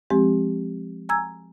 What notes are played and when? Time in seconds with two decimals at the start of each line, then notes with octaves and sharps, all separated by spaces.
0.10 F3 G#3 C4 G4
1.09 G#5 A#5 E6 G#6